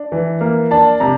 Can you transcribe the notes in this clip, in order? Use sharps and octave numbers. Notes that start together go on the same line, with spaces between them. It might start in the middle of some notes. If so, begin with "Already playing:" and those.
Already playing: D4
E3
A#3
D4 A5
C3 A#5